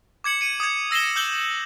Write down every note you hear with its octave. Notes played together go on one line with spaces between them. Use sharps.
D6 G#6 C#7 F#7
C#7 D#7
D#6 G#6
E6 A#6 C7 E7 G7
E6 G6 F#7 G7